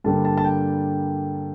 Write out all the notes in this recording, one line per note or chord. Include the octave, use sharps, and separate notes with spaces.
G2 D3 G3 A#3 A5
A5
A5
G5